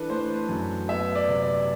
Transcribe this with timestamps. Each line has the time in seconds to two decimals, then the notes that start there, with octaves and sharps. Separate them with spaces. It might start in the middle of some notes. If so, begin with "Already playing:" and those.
Already playing: E3 D4 A4 B4
0.10 A3 C5
0.49 F#2
0.89 B3 E5
1.15 D5
1.29 C3
1.42 D5